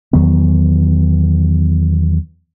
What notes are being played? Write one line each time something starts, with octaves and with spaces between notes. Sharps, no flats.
E2 D#3 F#3 B3